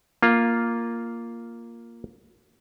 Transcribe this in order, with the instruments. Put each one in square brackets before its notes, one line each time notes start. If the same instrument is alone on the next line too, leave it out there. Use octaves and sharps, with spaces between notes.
[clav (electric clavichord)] A#3 F4